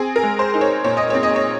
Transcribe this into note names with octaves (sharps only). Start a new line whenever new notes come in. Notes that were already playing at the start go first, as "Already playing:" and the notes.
Already playing: C4 G#4
A#4
G#3
C5
D#4
C#5
A#2 C#5
D#5
C4 C#5
D#5
C#5